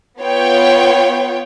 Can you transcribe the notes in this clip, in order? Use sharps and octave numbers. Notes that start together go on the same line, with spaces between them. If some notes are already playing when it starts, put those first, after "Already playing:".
B3 F4 C#5 G5